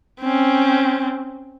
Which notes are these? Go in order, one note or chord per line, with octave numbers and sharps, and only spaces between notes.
C4 C#4